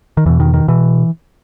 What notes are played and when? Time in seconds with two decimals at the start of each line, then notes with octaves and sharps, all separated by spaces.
0.17 D#3
0.26 E2 B2 E3
0.40 D#3
0.54 D#3
0.68 B2 E3